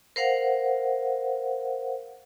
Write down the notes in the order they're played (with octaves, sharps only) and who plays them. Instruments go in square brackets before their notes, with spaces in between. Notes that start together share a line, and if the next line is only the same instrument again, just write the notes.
[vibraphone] A#4 C5 F5 F#5